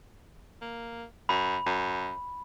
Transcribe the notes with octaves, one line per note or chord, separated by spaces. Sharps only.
A#3
F#2 B5
F#2